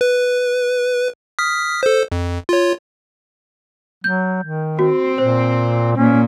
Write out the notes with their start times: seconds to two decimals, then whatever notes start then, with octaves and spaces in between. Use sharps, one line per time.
0.01 B4
1.39 D#6 F6 B6
1.83 A4 C5
2.12 F2
2.49 F4 C#5
4.04 F#3 G6
4.43 D#3
4.79 C4 F#4
5.18 A#2 C5
5.97 A#2 C#4